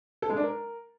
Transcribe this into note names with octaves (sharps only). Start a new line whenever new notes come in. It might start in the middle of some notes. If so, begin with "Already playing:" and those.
A4
G#3
D4
A#4